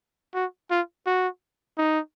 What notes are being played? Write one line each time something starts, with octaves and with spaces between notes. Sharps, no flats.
F#4
F4
F#4
D#4